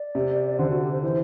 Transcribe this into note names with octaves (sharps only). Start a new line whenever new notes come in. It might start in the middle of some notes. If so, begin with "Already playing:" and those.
Already playing: D5
C3
D3 C5
F#4
G4
C5
E3 C5